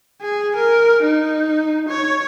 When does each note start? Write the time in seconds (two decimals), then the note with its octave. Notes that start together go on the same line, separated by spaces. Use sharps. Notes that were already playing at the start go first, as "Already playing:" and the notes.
0.21 G#4
0.56 A#4
1.02 D#4
1.89 C#5